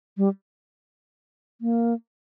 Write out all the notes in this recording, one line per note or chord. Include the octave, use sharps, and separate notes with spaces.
G3
A#3